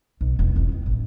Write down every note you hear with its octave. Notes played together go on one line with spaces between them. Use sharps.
B1
E1
C#2
D#3
A1